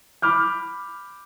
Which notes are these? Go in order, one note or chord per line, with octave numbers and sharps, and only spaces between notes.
B5 D6 F6 G6